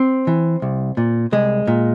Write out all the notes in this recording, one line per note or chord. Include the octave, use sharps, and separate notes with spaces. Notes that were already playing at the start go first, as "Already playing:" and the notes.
Already playing: C4
E3
C2
A#2
C2 G#3
A#2